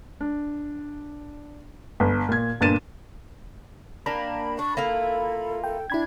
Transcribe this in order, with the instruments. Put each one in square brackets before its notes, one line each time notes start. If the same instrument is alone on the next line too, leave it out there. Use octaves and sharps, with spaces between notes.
[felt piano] D4
G1
A#2 G#6
G1 A#2 D4 A6 D#7 E7
[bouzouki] A#3 D4 G4 [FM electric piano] B5
[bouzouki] D4 [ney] C#6
[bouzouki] A#3 E4 F4 [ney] A4
[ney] A4 [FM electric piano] G5
[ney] D4 [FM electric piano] E4 B5 G#6